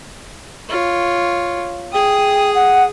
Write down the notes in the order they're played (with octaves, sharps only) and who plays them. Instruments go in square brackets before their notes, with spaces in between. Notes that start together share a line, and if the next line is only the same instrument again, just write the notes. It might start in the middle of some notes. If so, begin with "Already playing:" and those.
[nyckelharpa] F4 C#5
[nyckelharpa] G#4 D#6 [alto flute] G5
[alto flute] F#5